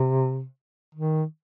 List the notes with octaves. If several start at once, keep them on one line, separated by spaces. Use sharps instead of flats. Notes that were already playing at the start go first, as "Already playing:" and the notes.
Already playing: C3
D#3